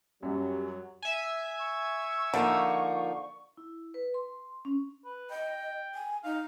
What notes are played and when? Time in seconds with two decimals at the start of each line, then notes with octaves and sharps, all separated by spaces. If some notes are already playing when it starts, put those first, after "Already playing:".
0.23 F#2 F#3 G3 C#4 G4
1.02 E5 G#5
1.59 C#6
2.34 D3 F3 A#3 D#4
3.57 E4
3.94 B4
4.14 C6
4.65 C#4
5.05 B4
5.31 D#5 G5
5.95 G#5
6.24 D#4 F5